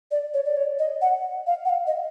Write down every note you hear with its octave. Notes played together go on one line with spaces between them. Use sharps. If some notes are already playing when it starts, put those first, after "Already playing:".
D5
C#5
D5
C#5
D#5
F#5
F5
F#5
F5
D#5